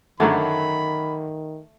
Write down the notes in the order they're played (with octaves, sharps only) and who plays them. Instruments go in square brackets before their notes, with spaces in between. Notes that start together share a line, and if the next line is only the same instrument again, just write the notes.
[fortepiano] F#2 D3 F#3 [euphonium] D#3 [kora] A3 [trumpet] B5